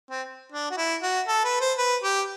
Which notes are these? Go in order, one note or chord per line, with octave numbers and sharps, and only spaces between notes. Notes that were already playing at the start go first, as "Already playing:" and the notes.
C4
D4
F#4
E4
F#4
A4
B4
C5
B4
G4